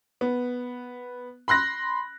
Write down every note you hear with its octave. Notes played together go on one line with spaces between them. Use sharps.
B3
B5 C6 F#6 A#6